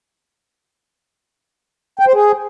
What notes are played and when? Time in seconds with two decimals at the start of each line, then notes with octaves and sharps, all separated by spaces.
1.99 G5
2.07 C5
2.14 G#4